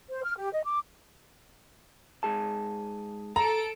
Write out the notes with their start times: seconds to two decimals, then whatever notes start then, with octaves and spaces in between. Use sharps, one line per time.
0.10 C5
0.24 F6
0.37 G4
0.53 D#5
0.65 D6
2.23 G#2 G#4 A5
3.36 A4 A#5 D7